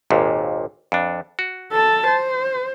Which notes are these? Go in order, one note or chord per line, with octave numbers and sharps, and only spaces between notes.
G#1 D#2 A#2
F2 D4
F#4
A4 A5
C5